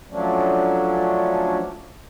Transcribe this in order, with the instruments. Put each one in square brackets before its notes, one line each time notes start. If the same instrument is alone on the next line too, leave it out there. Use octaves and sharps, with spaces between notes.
[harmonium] F3 F#3 A3 C#4 D4